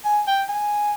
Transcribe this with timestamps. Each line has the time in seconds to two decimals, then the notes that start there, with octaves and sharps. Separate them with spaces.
0.05 G#5
0.27 G5
0.49 G#5